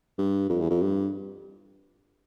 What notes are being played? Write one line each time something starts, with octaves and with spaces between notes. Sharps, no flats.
G2
F2
E2
F2
G2